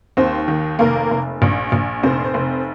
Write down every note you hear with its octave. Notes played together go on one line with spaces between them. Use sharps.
D#2 C4 C5
D#3
F1 A#3 A#4
F1
A#1
A#1
F1 C4 C5
F1